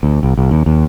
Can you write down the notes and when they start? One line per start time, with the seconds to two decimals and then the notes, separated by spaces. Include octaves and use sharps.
0.03 D2
0.23 C2
0.38 C2
0.51 D#2
0.66 D#2